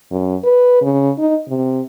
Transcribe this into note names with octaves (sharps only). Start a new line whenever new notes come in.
F#2
B4
C#3
D#4
C3